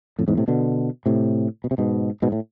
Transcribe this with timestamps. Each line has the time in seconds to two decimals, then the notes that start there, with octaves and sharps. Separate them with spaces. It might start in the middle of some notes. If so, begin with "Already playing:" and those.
0.19 F2 A2
0.28 E2 G#2
0.37 A2 C3
0.48 B2 D3
1.06 A2 C3
1.64 B2
1.71 C3
1.78 G#2 B2
2.22 G#2 B2
2.32 A2